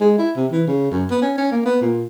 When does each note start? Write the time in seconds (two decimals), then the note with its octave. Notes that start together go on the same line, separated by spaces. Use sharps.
0.01 G#3
0.19 E4
0.36 C3
0.52 E3
0.67 C#3
0.91 F#2
1.11 B3
1.22 C#4
1.38 C#4
1.52 A#3
1.65 B3
1.81 A#2